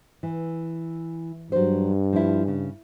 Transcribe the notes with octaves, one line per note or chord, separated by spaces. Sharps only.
E3
G2 F#3 C5
F3 E4
C#3